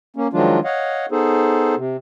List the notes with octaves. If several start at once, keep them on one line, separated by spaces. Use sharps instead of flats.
A#3 C#4
D#3 F3 F#3 G#3 D4 F4
C#5 D#5 F5 F#5
B3 D#4 G#4 A4 C5
C3